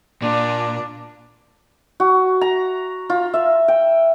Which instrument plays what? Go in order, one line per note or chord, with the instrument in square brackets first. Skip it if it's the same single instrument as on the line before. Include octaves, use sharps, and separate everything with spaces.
[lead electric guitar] A#2 [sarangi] D4
[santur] F#4
A#5
F4
E5
G5